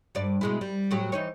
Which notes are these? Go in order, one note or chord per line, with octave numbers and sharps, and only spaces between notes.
G2 D5
B2 G#3 E4
G3
A2 F#3 G4
E3 D#4 C#5